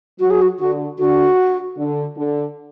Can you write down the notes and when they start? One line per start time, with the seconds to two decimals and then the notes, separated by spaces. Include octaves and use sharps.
0.20 F#3 F#4
0.30 G#4
0.42 F#4
0.59 D3 F#4
0.98 D3 F#4
1.77 D3
2.16 D3